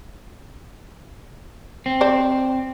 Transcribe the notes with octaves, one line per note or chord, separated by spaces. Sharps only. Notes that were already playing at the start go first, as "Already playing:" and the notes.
C4
C5 D5